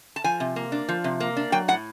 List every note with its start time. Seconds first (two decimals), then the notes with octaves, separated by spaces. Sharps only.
0.16 A5
0.24 F3 G#5
0.40 C3
0.56 A#3
0.72 D4
0.89 F3
1.04 C3
1.20 A#3
1.37 D4
1.52 F#3 G5
1.68 A2 F#5